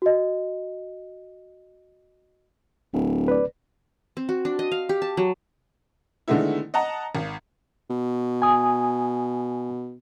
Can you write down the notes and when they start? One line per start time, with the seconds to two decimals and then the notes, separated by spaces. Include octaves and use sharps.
0.02 F#4 D#5
2.93 D1
3.28 B4 D5
4.17 C4
4.29 F#4
4.45 D4
4.59 D#5
4.72 F5
4.89 G4
5.02 A5
5.17 F#3
6.28 D3 D#3 G#3 A3 B3 E4
6.74 D#5 F#5 A5 A#5
7.15 G#1
7.90 B2
8.42 G#5 D#6